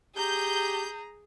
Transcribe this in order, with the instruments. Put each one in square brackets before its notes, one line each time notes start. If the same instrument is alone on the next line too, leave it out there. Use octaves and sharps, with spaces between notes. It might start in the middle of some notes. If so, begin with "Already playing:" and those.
[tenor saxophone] G4 [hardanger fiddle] G#4 [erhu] A#5 [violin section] G6